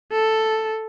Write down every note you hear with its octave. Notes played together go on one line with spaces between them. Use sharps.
A4